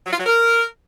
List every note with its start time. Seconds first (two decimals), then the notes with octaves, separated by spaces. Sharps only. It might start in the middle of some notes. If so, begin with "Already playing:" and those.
0.06 F#3
0.13 F4
0.20 F#3
0.26 A#4